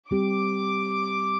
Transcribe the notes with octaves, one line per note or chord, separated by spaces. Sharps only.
G3 C4 G4 D6